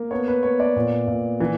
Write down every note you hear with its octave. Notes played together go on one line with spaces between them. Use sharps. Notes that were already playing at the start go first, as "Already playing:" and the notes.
Already playing: A#3
B3 C#5
B4
B3 C#5
D5
A#2
A#2
E3